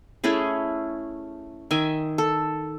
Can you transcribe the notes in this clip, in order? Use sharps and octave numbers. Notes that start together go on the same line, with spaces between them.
A3 C#4 E4 G#4
D#3 D#5 E5 G#5
A4